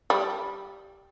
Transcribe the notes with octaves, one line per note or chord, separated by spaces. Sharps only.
G3